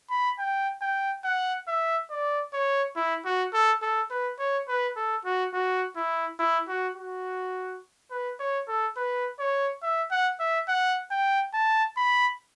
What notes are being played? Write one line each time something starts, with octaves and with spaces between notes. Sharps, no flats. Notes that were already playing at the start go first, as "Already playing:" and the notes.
B5
G5
G5
F#5
E5
D5
C#5
E4
F#4
A4
A4
B4
C#5
B4
A4
F#4
F#4
E4
E4
F#4
F#4
B4
C#5
A4
B4
C#5
E5
F#5
E5
F#5
G5
A5
B5